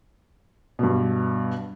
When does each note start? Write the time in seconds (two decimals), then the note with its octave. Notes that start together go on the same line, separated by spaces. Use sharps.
0.79 G2 B2